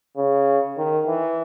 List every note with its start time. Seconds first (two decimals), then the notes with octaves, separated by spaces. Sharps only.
0.17 C#3
0.77 D#3
1.07 E3